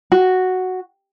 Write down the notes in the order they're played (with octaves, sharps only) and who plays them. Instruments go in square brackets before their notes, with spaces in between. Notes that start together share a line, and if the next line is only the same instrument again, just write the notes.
[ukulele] F#4